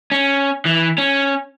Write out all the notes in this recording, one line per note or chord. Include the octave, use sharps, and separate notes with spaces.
C#4
E3
C#4